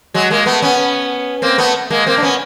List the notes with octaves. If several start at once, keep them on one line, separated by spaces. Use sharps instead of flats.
F#3 G#3
G#3 A#3
A3 B3
B3 C#4
A#3 C4
A3 B3
G#3 A#3
A#3 C4
D4
B3 C#4